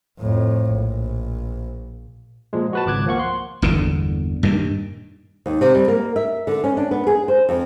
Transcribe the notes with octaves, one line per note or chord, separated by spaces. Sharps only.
F2 A2
A#1
A#2 F3 G#3
F#4 B4 A5
G#1 C#2 D6 F#6 G#6
F3 A#3 F#5 C#6
C6
G1 E2 A#2 D3
G2 A#2 D#3
D#2
C3
G3
A#3
E5
D3
C#4
D4
B3
G#4
C5
F2